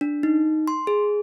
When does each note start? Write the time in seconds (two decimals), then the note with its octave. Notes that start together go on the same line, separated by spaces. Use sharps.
0.01 D4
0.23 D#4
0.68 C6
0.87 G#4